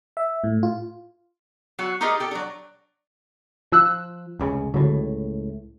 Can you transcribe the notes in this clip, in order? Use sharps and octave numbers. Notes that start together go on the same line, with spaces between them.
E5
A2
F4
F#3 F#4
D#4 F4 G4 G#4 A#4 D#5
G4 A4
F#3 D4
F3 F4 E6 F#6
F1 C#2 C#3
C#2 A2 D3 F#3